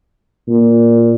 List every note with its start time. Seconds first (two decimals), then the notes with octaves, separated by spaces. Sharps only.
0.48 A#2